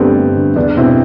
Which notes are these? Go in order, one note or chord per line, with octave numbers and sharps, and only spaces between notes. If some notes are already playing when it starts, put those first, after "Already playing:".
Already playing: G2 D3 G3 A3 B3 C4
G2
D3
E2 B3 D4
B2 C4 E4